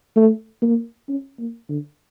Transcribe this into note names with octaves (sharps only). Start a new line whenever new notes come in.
A3
A#3
C#4
A#3
D3